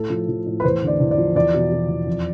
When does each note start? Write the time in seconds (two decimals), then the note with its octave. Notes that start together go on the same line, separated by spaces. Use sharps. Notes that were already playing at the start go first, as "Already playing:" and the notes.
Already playing: A2 A4
0.10 F3
0.28 F3
0.46 A2
0.60 B4
0.64 E2 C5
0.82 D3
0.87 D5
1.00 E2
1.11 D5
1.18 F3
1.35 E2 D5
1.54 B2
1.72 B2
1.89 E2
2.07 F2